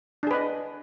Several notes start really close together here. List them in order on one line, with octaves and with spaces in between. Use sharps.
D4 G#4 B4 D#5